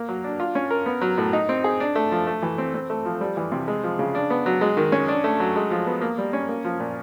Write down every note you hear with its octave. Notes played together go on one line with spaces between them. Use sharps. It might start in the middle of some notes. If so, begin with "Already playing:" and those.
Already playing: A#3
F#3
D4
F4
C#4
A#4
B3
F#3
A2
D#4
C4
G#4
D4
A3
F3
A3
E3
C4
C4
A3
F3
G3
E3
C3
G#3
F3
C#3
D4
B3
F#3
G#3
D#3
C#4
D4
A3
F#3
G#3
F3
B3
A#3
G3
C#4
A#3
F3
A#2